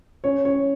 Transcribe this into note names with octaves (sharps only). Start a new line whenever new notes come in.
C#4 C#5
C#4 C#5